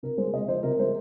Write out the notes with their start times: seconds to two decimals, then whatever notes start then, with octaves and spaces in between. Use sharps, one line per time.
0.03 C3 A#4
0.18 G#3 C5
0.33 C3 D#5
0.48 F3 C5
0.63 C3 A#4
0.79 G#3 C5